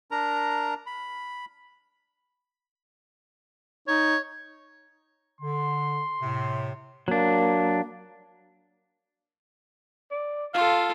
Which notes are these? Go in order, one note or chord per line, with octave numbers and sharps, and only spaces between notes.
D4 A#4 A#5
B5
D#4 C#5
D3 C6
A2 C3
F#3 A#3 D4
D5
F4 A4 F5